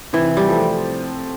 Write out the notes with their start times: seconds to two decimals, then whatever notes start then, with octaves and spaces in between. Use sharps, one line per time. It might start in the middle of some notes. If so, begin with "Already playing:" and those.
0.13 C3 E3
0.37 G3
0.48 F3 A3 C4